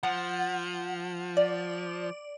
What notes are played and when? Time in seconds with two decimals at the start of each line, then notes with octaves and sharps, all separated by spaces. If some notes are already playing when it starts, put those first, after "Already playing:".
0.03 F3 F#5
1.37 D5